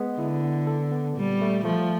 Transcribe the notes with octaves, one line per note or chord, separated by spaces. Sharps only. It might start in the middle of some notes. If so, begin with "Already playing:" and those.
Already playing: G#3 B3
D3 E4
B3
A4
B3
A#2 G3
A3
F3 A3